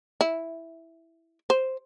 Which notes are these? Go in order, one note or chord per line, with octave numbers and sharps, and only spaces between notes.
E4
C5